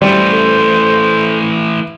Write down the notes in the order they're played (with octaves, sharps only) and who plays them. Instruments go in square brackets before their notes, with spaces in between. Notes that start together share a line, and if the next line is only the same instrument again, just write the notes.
[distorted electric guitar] E3 A3 [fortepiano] G3 [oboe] C5
[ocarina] A4